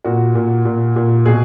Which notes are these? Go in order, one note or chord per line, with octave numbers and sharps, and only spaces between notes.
A#2 F#4
A#2
A#2
A#2
B2 G#4